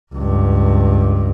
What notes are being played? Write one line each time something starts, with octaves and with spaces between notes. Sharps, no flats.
C#2 G2